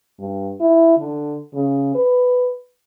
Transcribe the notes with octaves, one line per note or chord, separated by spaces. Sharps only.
G2
E4
D3
C#3
B4